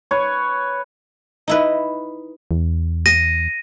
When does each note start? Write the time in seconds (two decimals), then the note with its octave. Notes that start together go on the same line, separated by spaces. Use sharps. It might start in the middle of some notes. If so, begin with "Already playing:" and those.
0.11 B4 C#5
1.48 D#4 E4 B4
2.51 E2
3.06 A#6 D#7